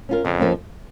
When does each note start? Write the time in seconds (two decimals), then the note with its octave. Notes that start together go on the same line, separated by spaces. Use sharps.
0.09 C#4 F4 A#4
0.24 F2 C#3
0.39 F3 A#3 C#4